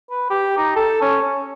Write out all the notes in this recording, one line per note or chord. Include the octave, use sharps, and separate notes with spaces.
B4
G4
D#4
A4
C#4
C#4